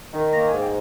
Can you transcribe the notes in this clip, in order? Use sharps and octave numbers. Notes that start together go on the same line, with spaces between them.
D#3
A#3 A#5
G#5
G#2
G5